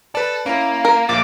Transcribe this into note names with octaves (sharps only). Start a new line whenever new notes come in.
A4 B4 D5
A#3 C#4 E4
A#4
A#1 A#2 D6 A6